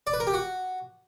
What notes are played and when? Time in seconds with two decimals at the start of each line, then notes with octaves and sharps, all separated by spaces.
0.07 D5
0.13 B4
0.20 A#4
0.27 G4
0.34 F#4